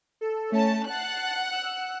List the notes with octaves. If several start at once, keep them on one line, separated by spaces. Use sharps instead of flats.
A4
A3 C#4 A5
F#5 A5 F#6 A6 C7
E6